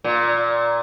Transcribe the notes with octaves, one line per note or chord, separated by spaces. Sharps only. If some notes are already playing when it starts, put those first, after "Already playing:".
A#2